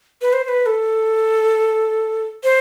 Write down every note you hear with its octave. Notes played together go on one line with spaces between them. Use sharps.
B4
C5
C5
B4
A4
C5